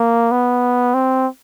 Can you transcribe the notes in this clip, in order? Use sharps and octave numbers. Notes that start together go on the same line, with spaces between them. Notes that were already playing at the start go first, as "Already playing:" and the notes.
Already playing: A#3
B3
C4